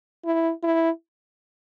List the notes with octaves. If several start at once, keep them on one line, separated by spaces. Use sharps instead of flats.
E4
E4